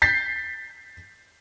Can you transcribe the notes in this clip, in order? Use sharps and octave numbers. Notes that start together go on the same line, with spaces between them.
G6 A6 B6 C7